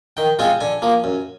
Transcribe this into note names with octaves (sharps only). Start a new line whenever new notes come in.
D#3 G5
G#3 C4 F4 G#5
D3 G#5
F3 A#3
F#2